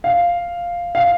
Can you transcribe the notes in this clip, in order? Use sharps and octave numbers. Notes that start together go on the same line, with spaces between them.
F5
F5